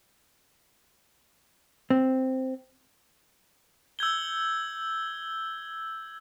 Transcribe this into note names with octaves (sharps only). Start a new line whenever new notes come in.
C4
E6 G6 G#6 G7